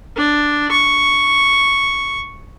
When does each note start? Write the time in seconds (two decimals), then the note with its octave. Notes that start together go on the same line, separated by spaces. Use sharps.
0.16 D4
0.71 C#6